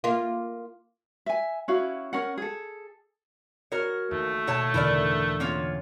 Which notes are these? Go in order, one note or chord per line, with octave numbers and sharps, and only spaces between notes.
A#3 F4
E5 G#5
C#4 E4 F#4 F5
C#4 A#4 F#5
G#4 A4
F#4 A#4 C#5
D#2 A3
B2 F#4 C#5 A5
E2 A2 D3 E4 A#4 D5
A#3 C#4 F4 C#5 E5 F#5